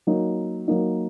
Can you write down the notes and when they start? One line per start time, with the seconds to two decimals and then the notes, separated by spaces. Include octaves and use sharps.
0.07 F#3 A#3 D#4
0.68 F#3 A#3 D#4